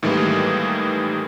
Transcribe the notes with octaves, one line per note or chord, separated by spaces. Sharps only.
A2 D#3 E3 G3 G#3 A#3